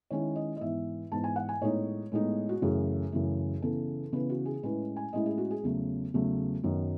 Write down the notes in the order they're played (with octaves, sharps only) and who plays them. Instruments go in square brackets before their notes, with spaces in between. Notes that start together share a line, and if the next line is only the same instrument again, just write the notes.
[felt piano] D#3 G#3 C#4 E4 C#5
D#5
D#5
G#2 E3 B3 E5
G#2 E3 B3 A5
G#5
F#5
G#5
A2 G#3 B3 D#4 C#5
A2 G#3 B3 D#4
F#4
F#2 C#3 E3 A3 G#4
F#2 C#3 E3 A3
C#3 E3 B3 A4
C#3 E3 B3 B4
F#4
G#4
A2 G#3 C#4 E4 B4
G#5
A2 G#3 C#4 E4 D#5
G#4
F#4
G#4
E2 C#3 F#3 A3
E2 C#3 F#3 A3
F#2 D#3 F#3 B3